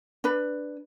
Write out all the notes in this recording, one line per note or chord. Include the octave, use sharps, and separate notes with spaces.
D4 B4